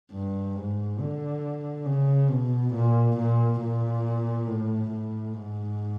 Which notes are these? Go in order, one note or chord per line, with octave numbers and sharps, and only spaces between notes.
G2
G#2
D3
C#3
B2
A#2
A#2
A#2
A2
A2
G#2